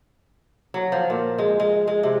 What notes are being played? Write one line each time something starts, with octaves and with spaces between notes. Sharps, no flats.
F#3
F3
A#2
G#3
G#3
G#3
C3